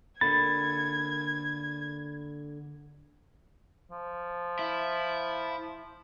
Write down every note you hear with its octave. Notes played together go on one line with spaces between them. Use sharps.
D3 A#3 B5 G#6 A6
F3
E4